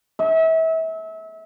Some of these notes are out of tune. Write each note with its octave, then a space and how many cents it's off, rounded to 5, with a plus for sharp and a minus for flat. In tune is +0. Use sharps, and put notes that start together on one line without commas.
E5 -30